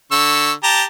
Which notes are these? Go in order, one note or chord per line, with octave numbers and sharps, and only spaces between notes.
D3 C#6 E6
G4 A5 A#5